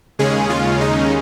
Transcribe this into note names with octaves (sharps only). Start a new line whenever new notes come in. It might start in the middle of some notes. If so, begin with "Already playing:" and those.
D#2 C#3 G#3 C#4 G#4
F4
D#4